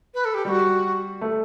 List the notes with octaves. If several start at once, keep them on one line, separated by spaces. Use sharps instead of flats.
B4
A4
G4
G3 F#4 G4
A3